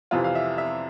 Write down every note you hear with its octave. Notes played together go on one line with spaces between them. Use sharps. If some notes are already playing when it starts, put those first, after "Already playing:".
F2 C3 E3 F4
F5
E5
E5